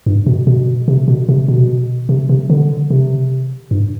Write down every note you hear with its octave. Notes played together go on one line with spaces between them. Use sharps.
G2
B2
B2
C3
B2
C3
B2
C3
C3
D3
C3
G2